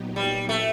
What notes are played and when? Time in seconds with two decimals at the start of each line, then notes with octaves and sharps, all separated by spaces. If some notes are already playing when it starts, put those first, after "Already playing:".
Already playing: A#2 F#3 B3 D#4 G4
0.16 G3
0.49 A3